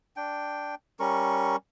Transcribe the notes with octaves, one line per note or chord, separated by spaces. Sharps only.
D4 G5
G3 C#4 A#4 C#6